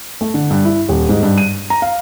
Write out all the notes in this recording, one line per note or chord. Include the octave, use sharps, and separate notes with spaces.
A3
D3
G2
E4
D#1
G#2
G2
D#7
A#5
F5